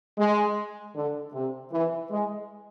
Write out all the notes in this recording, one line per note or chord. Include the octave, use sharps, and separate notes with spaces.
G#3
D3
C3
E3
G#3